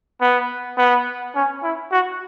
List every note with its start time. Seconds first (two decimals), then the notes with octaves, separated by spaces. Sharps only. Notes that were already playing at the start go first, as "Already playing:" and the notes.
0.21 B3
0.78 B3
1.35 C#4
1.63 E4
1.92 F#4